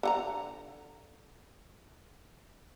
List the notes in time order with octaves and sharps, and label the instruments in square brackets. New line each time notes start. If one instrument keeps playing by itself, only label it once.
[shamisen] D3 F#5 A#5